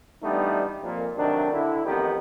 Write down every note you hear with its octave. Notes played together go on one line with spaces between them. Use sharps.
E3 G3 A3 B3 D4 D#4
F2 A#2
C3 D#3 F#3 A3 D4
D3 E4
A1 F2 D#3 B3 D#4 G4